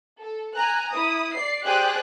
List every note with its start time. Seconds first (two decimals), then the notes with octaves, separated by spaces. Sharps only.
0.21 A4
0.55 G#5 A#5 F#6
0.92 E4 D#6
1.34 D5 C7
1.65 G4 G#4 C5 D5 G5 F#6